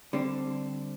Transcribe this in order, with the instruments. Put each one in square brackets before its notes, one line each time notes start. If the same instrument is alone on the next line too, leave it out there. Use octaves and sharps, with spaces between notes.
[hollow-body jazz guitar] D3 G3 C4 D4